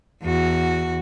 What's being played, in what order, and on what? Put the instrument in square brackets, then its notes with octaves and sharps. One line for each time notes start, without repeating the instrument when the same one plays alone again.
[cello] E2 F#4